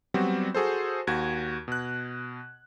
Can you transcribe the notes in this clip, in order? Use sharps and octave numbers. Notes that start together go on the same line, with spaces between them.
F#3 G3 B3 C4 F#4
F#4 G#4 A4 C5
D#2 F#4 G#6
B2 F#6